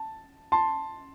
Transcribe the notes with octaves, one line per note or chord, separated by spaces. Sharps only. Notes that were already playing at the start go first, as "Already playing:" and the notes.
Already playing: A5
A5 C6